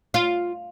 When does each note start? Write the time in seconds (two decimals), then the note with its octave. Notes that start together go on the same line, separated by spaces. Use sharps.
0.14 F4